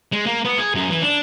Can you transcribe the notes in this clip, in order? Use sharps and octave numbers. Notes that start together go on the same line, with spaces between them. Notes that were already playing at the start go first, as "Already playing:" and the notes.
G#3
A#3
B3
G#4
F#2
E3
D4